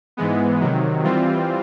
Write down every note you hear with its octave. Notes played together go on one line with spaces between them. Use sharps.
G#2 E3 G#3 B3
C3 D#3 F#3
E3 G3 C4 F4